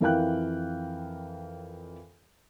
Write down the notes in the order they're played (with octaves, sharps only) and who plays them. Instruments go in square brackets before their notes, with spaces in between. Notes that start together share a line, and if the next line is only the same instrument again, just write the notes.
[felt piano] F2 E3 A#4 F5 G5 F#6